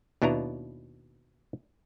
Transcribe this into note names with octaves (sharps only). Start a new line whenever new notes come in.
D#2 B2 D4 E4 B4 A#5